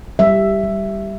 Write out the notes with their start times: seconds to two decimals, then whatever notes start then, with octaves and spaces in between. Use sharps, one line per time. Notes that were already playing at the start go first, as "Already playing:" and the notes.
0.19 G3 E5
0.63 G3